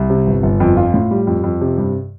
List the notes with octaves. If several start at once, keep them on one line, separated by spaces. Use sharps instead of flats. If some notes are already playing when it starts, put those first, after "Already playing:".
Already playing: C2
C3
G1
G1
F2
F4
A2
G3
F2
F2
C3
G2